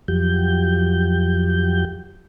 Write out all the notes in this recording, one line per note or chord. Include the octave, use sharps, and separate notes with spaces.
F2 F3 F#3 G4 G6